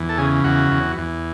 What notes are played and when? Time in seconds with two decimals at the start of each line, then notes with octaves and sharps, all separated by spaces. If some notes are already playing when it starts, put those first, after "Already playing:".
Already playing: E2
0.09 A4
0.18 C#3 G#4
0.44 E2 F#4
0.71 E2
0.98 E2